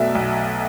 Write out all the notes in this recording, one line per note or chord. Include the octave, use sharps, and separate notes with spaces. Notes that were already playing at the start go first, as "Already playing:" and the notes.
Already playing: B1 B2 F#3 A3 D5 E5
B1